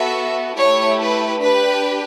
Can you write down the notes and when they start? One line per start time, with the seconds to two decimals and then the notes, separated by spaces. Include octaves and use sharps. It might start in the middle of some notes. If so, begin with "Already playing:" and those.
Already playing: B3 F#4 A4 E5
0.56 A3 E4 G4 C#5
1.00 B4
1.42 D4 G4 B4